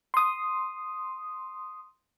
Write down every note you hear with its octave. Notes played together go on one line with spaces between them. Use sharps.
C6 D#6